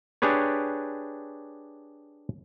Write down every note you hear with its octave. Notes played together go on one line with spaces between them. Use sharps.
D4 G4 G#4 B4 C#5